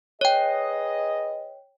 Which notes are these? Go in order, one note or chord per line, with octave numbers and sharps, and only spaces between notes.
G#4 B4 C#5 D#5 G5